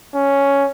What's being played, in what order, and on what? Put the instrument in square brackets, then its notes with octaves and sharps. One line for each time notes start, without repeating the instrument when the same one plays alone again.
[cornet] C#4